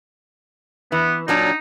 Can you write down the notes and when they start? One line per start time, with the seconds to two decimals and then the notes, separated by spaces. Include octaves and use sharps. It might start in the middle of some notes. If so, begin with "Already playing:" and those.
0.92 E3 B3
1.28 A#2 F#3 D4 D#4